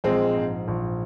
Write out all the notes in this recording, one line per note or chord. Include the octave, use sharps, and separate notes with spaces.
A#1 G#3 C4
G#2
A#1